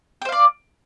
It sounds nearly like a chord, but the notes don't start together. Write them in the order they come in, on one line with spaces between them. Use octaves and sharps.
G5 C5 F5 D5